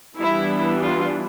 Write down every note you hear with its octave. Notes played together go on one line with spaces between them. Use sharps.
E3 G3 B3 D4 E4
F4